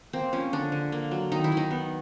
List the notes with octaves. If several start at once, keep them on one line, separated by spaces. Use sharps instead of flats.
A#3 C4
F3 C#4
D3 D4
D3
A#3
F#3
D#3 D#4
E4
D#3
D#4
B3